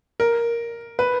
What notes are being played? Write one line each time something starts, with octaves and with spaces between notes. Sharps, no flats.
A#4
B4